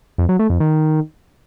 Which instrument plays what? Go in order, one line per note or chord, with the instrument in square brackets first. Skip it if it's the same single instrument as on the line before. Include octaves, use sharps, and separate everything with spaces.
[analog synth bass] F2
F#3
A3
F2
D#3